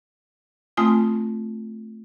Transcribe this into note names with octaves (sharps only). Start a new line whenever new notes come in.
A3 C4 F4 G#5 D#6